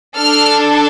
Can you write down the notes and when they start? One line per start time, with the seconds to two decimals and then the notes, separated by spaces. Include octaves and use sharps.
0.16 D4 A4 F6